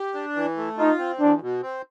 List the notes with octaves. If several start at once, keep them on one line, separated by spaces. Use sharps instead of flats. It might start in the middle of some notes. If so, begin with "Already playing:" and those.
Already playing: G4
D4
E3
A3
D#4 F4
C4
E2 D4
B2
C4